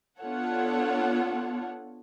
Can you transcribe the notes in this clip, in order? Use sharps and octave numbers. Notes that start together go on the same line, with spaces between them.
B3 D4 F4 A4 C#5 F#5